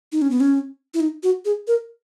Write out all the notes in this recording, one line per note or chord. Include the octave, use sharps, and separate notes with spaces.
D#4
C#4
B3
C#4
E4
D#4
F#4
G#4
A#4